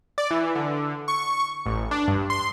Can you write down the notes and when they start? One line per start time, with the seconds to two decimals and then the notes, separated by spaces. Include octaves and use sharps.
0.18 D5
0.31 E3
0.55 D3
1.08 C#6
1.66 A1
1.91 D4
2.08 G2
2.30 C6